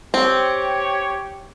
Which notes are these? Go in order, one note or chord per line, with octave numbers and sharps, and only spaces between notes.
C4 G4 C#5